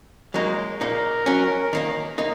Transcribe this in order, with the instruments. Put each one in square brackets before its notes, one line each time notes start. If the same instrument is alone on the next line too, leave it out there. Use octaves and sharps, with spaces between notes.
[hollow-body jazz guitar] F#3 A#3 D#4 [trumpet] G#3
[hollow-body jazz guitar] A#2 A#3 D#4 [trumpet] A#4
[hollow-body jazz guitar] F#3 C#4
D#3 A#3 D#4
A#3 D#4